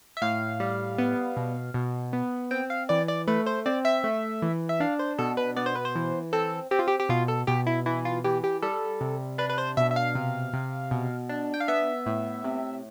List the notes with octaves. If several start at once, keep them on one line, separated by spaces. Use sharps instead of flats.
E5
A2 F5
G3
B3
B2
B2
B3
C4 G5
F5
E3 D5
D5
A3 B4
C5
C4 D5
E5
A3
E3
E5
D4 F5
C5
B2 A4
B4
B3 D5
C5
B4
C5
E3
C4 A4
C4 G4
F4
G4
G4
B2 F4
A4
B2 G4
E4
E3 E4
F4
E3 G4
G4
G3 A4
C3
D4 B4
B4
C5
B2 E5
E5
F5
C3
C3
B2
D4
G5
F5
B3 E5
A2
C3